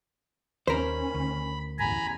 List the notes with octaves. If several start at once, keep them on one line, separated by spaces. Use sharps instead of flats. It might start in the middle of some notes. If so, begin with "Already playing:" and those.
D#2 D#3 C#4 A#4 C5 B5
D2
A1 E2 G#5 A#5 B5